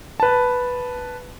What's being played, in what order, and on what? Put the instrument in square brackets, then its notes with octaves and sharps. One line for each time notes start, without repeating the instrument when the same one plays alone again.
[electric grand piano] B4 A5